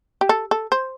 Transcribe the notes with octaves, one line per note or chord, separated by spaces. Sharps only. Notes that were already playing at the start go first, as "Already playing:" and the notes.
G4
A4
A4
C5